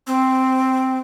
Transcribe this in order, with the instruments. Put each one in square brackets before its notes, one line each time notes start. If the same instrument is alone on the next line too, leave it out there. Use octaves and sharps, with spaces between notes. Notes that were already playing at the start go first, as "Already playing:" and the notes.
[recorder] C4